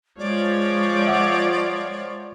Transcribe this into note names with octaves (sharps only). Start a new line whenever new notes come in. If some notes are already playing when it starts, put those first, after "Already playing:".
F3 G#3 C#5 D5
E5 F#5 D6